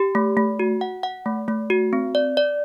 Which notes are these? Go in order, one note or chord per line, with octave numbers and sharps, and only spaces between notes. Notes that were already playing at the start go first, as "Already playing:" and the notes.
Already playing: G4
A3
A3
F#4
F#5
F#5
A3
A3
F#4
C4
D5
D5